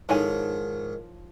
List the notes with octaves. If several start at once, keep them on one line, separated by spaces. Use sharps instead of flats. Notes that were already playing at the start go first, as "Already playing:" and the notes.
G#2 D#3 F3 D#4 E4 A4 C#5 G#5